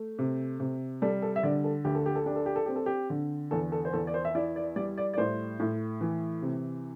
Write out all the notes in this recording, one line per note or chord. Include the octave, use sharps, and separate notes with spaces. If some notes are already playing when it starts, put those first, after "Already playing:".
Already playing: A3
C3
C3
G3 A4
A4
E5
D3 D5
A4
D2 G4
A4
G4
A4
D4 G4
A4
G4
A4
C4 G4
A4
G4
D3
E2 A4
A4
C5
E2 A4
D5
C5
E5
E4 D5
D5
G3 D5
D5
D5
A2 C5
A2
E3
C3